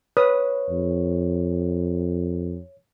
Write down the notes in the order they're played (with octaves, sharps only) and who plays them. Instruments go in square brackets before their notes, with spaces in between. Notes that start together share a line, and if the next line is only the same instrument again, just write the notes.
[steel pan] B4 D#6 [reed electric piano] C#5
[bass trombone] F2